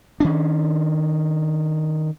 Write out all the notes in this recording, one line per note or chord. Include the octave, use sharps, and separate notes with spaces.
D#3 C#4 D4